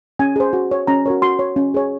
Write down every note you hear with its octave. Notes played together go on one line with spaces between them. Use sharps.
C#4 G#5
G#4 C5
F#4
C#5
C#4 A#5
F#4 A#4 C#5
F#4 C6
C#5
C#4
G#4 C#5